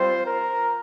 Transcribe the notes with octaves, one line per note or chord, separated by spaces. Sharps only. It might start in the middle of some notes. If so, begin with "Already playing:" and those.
Already playing: G3 C4 F4 C5
A#4